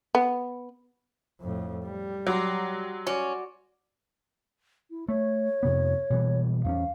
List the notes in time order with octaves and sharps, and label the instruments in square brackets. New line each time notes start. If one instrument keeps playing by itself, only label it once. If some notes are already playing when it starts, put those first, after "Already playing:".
[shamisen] B3
[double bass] F2 A2
G3
[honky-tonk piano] F#3 [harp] A#5 C6 D6
[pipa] C#4 [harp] F#4 D5
[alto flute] E4
[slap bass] A3 [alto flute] C#5
[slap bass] F2 C3 B3
B2 E3 G3
[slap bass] E2 C4 C#4 [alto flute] F5